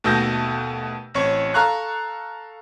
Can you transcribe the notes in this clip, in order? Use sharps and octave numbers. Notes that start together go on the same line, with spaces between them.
D#2 B2 A3 E6 G6 A#6
A1 C4 C#5 C#6
A4 F5 A#5 C#6 F#6